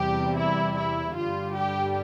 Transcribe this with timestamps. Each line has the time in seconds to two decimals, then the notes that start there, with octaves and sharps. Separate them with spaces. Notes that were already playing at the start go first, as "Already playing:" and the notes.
Already playing: E2 C3 E3 G3 G4
0.36 E4
0.75 E4
1.15 G2 D3 G3 F4
1.54 G4